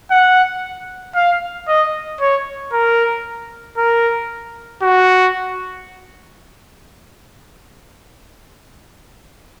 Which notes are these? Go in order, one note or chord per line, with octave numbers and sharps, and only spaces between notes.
F#5
F5
D#5
C#5
A#4
A#4
F#4